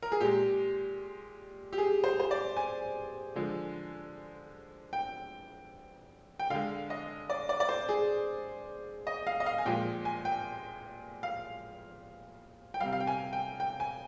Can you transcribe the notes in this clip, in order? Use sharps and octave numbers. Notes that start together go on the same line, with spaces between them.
A#4
G#4
A#2 G#3 G4
G4
G#4
C5
C5
D5
G#5
D3 F3 G#3
G5
G5
D3 G#3 F5
D#5
D5
D5
D5
C5
G#4
D#5
F5
D#5
F5
G#5
A#2 F3 G#3 G5
G#5
G5
F5
G5
C3 G3 F5
F5
G5
G#5
G5
G5
G#5